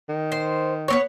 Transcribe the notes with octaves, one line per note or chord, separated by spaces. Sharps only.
D#3
C5
B3 C4 C#5